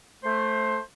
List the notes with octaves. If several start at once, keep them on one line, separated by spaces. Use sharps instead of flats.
A3 C5